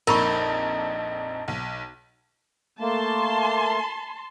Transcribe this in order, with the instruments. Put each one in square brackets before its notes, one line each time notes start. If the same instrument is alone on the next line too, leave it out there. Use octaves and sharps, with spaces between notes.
[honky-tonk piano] A#1 F2 A5 [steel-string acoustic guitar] D#4 [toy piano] A#4 B5 C#6
[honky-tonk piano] B1
[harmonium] A3 A#3 [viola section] A5 C6